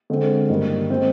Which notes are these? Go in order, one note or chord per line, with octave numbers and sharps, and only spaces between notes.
D3 G#3 C4
G2 D#3 A#3
D#3 G#3 C4